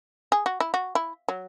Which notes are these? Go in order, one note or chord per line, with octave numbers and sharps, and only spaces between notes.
G#4
F#4
E4
F#4
E4
F#3